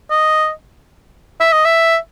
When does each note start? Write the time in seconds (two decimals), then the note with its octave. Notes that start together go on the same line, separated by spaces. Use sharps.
0.10 D#5
1.40 E5
1.52 D#5
1.65 E5